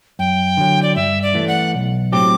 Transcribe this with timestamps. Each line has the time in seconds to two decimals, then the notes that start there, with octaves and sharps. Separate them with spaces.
0.19 F#2 G5
0.57 D3 F#3
0.83 D5
0.96 G2 E5
1.22 D5
1.35 E3 A3
1.48 F#5
1.75 B1
2.12 A2 F#3 C4 G4 D6